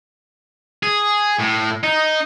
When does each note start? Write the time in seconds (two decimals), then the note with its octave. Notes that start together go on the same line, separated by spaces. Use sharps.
0.83 G#4
1.40 A2
1.84 D#4